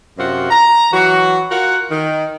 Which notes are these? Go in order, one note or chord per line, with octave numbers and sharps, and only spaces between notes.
F#2 C3 C4 F4 F#4
A#5
E3 F#3 F#4
F4 F#4 A#4 F#5
D#3